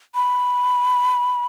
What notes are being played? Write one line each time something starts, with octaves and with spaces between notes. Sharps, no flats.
B5